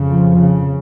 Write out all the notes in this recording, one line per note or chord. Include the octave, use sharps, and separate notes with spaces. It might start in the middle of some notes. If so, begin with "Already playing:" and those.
Already playing: F2 C#3
F3
C#3